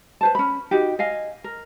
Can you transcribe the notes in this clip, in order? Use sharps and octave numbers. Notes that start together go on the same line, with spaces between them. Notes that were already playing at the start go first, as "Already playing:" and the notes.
B4 C5 A5
C#4 B5
D#4 F#4 G4
D#5 F5 G#5
A#4